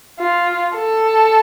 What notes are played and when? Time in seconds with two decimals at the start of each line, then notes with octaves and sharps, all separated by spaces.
0.20 F4
0.75 A4